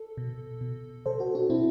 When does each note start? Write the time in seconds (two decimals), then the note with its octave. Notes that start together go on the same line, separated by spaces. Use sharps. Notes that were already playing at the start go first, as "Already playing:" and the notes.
Already playing: A4
0.17 B2
0.61 B2
1.06 B2 A4 C5
1.20 F#4 A4
1.35 D4 F#4
1.50 B2 C4 E4